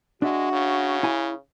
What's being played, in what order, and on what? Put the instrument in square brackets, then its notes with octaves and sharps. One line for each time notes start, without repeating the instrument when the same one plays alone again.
[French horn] G#3 [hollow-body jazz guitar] D4 E5 [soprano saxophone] F#4
[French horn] C#3
[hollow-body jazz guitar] E4 G#5